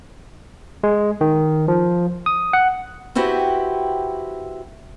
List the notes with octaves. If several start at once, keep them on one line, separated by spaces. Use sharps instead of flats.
G#3
D#3
F3
D#6
F#5
C4 E4 F#4 G4 B4